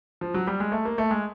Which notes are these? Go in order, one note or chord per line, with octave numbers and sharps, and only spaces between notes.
F3
F#3
G3
G#3
A3
A#3
A3
G#3